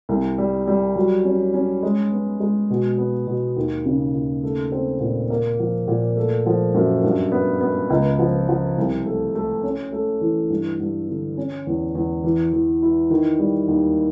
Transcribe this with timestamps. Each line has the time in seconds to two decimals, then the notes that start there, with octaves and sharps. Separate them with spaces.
0.09 C2
0.38 G3
0.68 G3
0.96 F#3
1.25 C#4
1.54 C#4
1.83 G#3
2.12 B3
2.40 G#3
2.70 B2
2.98 B3
3.27 B2
3.57 D#2
3.86 C#3
4.14 D#2
4.43 A3
4.72 C4
5.00 A#2
5.30 A#3
5.59 F3
5.88 A#2
6.16 A3
6.46 F3
6.75 F#2
7.04 G2
7.32 B3
7.61 B3
7.90 C#2
8.19 F3
8.49 F3
8.78 C2
9.06 A3
9.35 A3
9.63 C#4
9.93 A3
10.21 E3
10.50 G2
10.80 G2
11.09 D3
11.37 C#4
11.67 E2
11.95 E2
12.24 E3
12.53 E3
12.82 E4
13.10 D#3
13.39 G3
13.68 D#2